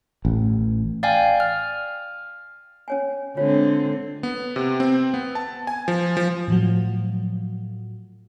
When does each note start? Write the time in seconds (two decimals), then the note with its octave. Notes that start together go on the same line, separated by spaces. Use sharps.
0.25 A1
1.03 D5 F5 G5 G#5
1.40 F6
2.88 C#4 C#5 G#5
3.37 D3 G#3 C4 F4 C#5
4.23 B3
4.56 C3
4.80 C4
5.14 B3
5.35 A5
5.67 G#5
5.88 F3
6.17 F3
6.48 A2 F3 F#3